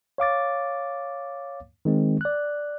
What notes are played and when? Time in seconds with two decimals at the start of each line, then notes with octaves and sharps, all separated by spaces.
0.18 C#5 F5 D6 A6
1.85 D#3 G#3 C4
2.21 D5 F#6